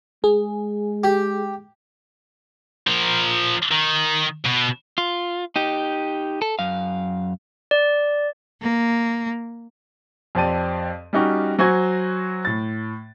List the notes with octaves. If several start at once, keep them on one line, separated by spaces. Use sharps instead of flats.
G#3 G#4
G4
F3 A#4
D#3
B2
F4
D#4 G4
A4
F#2 F5
D5
A#3
F2 C4 G4 D5 A5 D#7
G3 C#4 D#4 F#4 G4
F#3 F#4 C5 G#5 G#6
A2 A6